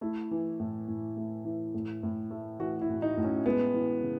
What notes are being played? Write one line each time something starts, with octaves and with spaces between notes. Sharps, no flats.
A3 E4
E3
A2
A2
A3
E3
A2
A2
A3
E3 F#4
E4
A2
D#4
A2
C#4
G#3 B3
E3
C#3